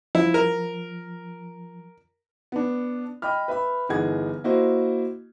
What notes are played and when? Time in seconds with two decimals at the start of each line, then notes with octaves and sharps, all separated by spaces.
0.15 F3 E4
0.34 A#4
2.52 B3 D4
3.22 D#5 G5 B5 F6
3.48 B4 E5 B5
3.89 G1 E3 D#4 G#4 F#5 G#6
4.44 A#3 E4 F#4 C5 D#5